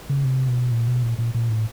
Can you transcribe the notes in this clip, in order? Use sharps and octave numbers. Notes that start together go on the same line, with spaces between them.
C#3
C3
B2
A#2
B2
A#2
A#2
A#2
A2